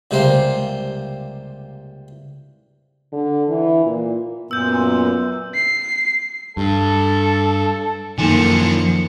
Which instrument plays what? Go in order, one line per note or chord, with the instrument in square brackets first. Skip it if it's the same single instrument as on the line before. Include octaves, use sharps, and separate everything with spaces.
[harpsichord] C#2 C3 G3 A#3 C5
[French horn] D3
E3
A#2
[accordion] F#2 A#2 [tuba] B3 [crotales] E6 G6
[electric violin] C7
[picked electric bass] G2 [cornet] A4
[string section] F#2 C#7 [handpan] D#3 [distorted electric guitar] F3 D4 [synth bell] A#3 D#4 G#5